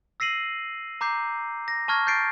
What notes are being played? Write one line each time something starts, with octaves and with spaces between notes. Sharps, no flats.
E6 A#6 C7 D#7 F#7
A#5 D6 G6 C7
A#6
A5 C#6 F6 G#6 A#6
G6 A6 C7 D7